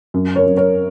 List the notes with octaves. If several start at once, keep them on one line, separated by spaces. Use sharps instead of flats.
F#2
A#4 C#5
F#2
A#4 C#5